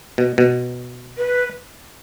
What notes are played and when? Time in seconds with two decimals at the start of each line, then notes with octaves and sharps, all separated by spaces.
0.18 B2
0.38 B2
1.18 B4